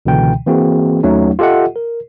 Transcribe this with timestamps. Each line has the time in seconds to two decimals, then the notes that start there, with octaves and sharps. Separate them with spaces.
0.06 C#2 B2 D3 E3 G5
0.46 E3 A#3 C4 F#4 G#4
1.03 D#2 F#3 A3 C#4 D#4
1.39 F4 G4 A4 D#5 E5 F#5
1.76 A#4